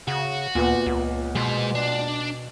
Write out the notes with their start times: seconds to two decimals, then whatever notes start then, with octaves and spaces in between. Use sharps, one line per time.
0.08 C#3 F#4
0.55 D2 A#2 B3
0.86 C#2
1.35 B2 G#3 C5
1.75 D4